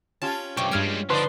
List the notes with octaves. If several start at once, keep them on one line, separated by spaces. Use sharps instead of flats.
C#4 F4 G4 A5
C2 G2 G5 C#6 D6
G2 G3 G#3 F6 G#6
D3 F3 D#4 B4 D5 C6